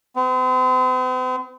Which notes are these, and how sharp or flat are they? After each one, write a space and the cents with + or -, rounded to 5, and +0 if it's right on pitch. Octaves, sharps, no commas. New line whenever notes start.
C4 -45